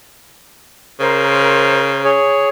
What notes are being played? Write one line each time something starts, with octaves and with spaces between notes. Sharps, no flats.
C#3 A#4 C5
G#4 C#5